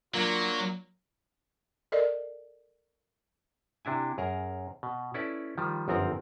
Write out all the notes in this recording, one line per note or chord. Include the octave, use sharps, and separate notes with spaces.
F#3 A#3 D4 F4
A4 A#4 D5 D#5
C3 D4 E4 G#5
F#2 G#4 A#4 A#5
B2
C#4 E4 A4 B4 D5
D#3 F3 G3
G1 F#2 F3 C4 A#4 A#5